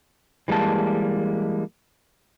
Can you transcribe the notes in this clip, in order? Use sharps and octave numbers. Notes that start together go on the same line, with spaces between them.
E3 G3 G#3 A#3 A5